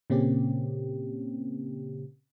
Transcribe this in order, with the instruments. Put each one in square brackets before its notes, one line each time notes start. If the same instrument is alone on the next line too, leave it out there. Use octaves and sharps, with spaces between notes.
[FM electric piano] A#2 C#3 A#3 C4 C#4 G4